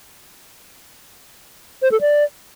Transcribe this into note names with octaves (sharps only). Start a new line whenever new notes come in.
C5
A4
D5